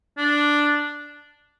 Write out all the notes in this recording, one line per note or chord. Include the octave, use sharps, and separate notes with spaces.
D4